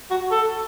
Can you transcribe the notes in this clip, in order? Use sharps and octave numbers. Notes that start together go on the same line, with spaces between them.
F#4
A4